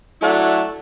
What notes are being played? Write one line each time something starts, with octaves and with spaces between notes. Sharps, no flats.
F#3 A3 D4 E4 F#4